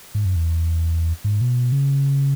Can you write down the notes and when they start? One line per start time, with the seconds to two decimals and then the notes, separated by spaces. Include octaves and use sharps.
0.15 G#2
0.25 F#2
0.36 E2
1.24 G#2
1.41 B2
1.72 C#3